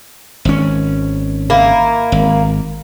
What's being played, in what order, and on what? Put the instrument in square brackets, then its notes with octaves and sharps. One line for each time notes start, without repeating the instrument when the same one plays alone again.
[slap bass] G#1 C#4
[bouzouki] A#3 E4
[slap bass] G#1